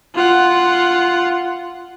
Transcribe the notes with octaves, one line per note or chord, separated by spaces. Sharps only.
F4 F#5